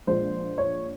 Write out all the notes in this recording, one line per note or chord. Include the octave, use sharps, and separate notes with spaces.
A#1 A#2 F3 G#3 C5
C#5